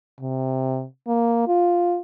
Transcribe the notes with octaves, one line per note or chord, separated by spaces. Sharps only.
C3
A#3
F4